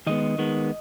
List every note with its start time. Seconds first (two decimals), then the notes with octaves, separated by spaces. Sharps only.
0.07 D#3 G#3 B3 D#5
0.38 D#3 G#3 B3